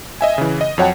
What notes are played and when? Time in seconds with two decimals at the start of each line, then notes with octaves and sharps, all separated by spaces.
0.21 D#5 E5 G#5
0.38 C#3 E3
0.61 D#5
0.78 F2 F#3 C#5 F#5 G5 A5